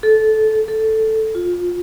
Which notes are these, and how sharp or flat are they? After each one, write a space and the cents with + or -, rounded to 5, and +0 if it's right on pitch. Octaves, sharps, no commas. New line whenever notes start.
A4 -15
A4 +0
F4 +20